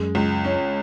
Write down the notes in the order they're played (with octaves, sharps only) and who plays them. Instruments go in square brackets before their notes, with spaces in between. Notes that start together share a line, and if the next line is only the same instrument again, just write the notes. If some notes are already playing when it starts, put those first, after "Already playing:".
Already playing: [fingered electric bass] F#2 [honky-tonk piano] G#3
[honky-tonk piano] C#2
C#4